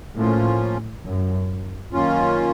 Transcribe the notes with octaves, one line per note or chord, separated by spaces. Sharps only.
A2 F3 A#3 C#4 F4
F#2
F#2 D#3 A#3 C#4 F4